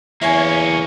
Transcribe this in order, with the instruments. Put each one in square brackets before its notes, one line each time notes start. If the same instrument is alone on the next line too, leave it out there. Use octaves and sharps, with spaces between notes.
[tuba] E2 [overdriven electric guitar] A#3 C#4 [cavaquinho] E4 C#5 G#5